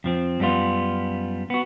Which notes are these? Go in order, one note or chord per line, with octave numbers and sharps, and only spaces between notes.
F2 F3 C4
F#2 G3 B3 F4
B3 F#4